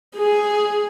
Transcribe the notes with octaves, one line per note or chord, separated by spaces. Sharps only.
G#4